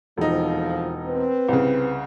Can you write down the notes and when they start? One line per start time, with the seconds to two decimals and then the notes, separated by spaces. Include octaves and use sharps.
0.18 E1 F2 F3 D#4
1.06 C4 B4
1.48 C2 C#3